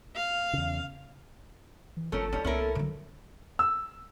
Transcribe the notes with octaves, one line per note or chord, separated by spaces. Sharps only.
F5
E2 C#3
E3
G1 F3 A3 C#4 A4 A#4
G3 C#4 D#4
C2 A#3 B3 C#4 E4 A#4
D3 F#3
E6